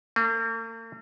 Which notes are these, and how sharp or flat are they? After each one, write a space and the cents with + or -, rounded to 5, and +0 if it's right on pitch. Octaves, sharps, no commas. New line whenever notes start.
A#3 -45